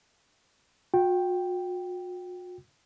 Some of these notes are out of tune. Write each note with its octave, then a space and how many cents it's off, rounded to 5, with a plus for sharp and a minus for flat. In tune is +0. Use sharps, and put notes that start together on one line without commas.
F#4 -45 G5 +0